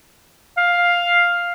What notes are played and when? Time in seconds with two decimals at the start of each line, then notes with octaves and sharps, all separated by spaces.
0.58 F5